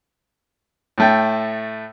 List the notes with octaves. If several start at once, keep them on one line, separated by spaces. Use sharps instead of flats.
A2 A3 G5